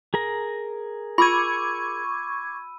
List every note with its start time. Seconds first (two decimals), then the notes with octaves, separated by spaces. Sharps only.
0.14 G#4 A#4 A#5
1.18 F4 B5 C#6 D6 E6 G#6 D#7